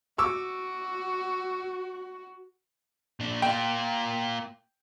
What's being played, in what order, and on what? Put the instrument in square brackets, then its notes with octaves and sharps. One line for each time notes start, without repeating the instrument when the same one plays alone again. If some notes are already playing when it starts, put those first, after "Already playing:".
[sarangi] F#4 [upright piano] C#6 D6 E6
[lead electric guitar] A#2 D4
[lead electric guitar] A#3 F4 [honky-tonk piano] G5